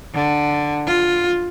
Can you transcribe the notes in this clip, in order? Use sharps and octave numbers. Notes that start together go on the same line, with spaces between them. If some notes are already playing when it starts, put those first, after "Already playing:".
D3
F4